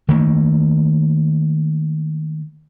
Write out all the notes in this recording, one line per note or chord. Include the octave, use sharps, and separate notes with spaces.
D#3 A3 A#3